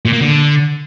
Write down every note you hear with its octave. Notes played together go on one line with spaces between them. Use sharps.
A#2
A#3
D3